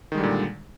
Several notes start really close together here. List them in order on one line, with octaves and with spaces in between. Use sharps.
D#3 G#3 G3 D3 A#2